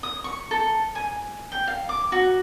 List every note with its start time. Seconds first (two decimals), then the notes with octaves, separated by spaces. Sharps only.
0.03 D#6
0.24 C#6
0.51 A4
0.95 G#5
1.52 G5
1.68 F5
1.89 D6
2.12 F#4